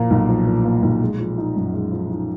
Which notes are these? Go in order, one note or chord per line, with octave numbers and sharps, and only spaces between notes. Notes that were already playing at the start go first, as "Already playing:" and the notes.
Already playing: A#2 F3 A#3
B1
F3
A#2
A#3
B1
G#3
F3
D#4
F#2
G#3
F3
D#4